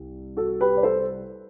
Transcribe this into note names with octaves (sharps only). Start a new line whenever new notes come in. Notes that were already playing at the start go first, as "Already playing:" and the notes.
Already playing: C2
F#4 A4
G4 B4
D5
A4 C5